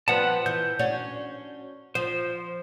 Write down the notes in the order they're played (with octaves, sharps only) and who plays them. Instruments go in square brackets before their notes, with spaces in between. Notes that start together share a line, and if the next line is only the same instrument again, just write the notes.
[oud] F3 G3 B3 [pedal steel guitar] B4 F#5 A5
[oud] E3 [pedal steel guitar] G6
[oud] C#4 D4 F#4
[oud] F3 [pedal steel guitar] C5